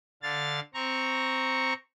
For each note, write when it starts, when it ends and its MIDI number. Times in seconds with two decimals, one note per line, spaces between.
0.23 0.60 50
0.23 0.60 77
0.23 0.60 93
0.74 1.74 60
0.74 1.74 82
0.74 1.74 85